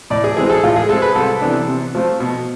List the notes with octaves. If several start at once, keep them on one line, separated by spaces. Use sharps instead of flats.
A2 D5
G#4
E3 G#3 C4 G#4
A4
A2 F4
G#4
G#3 C4 A4
B4
C2 A4
C3 E3 B3 D4
C3
F3 A3 C4
B2